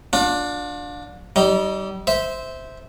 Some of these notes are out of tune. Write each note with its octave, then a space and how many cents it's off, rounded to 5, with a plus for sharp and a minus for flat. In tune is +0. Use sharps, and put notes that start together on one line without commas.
D4 +0 F4 +40
G3 -30 D#4 +0
C5 -10 E5 -15